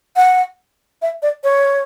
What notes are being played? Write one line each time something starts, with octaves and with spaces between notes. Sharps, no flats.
F#5
E5
D5
C#5